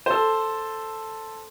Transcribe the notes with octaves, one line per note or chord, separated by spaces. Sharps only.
A4 C5